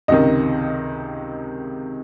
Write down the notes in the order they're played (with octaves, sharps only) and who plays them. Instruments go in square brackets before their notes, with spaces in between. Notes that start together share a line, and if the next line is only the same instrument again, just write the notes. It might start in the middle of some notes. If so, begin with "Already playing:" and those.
[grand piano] C#2 C3 D#3 D#5